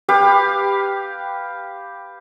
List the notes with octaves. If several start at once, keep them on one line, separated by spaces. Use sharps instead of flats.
G4 B4 F5